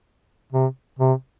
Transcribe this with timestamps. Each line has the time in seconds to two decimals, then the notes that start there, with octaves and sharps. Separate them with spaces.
0.52 C3
0.99 C3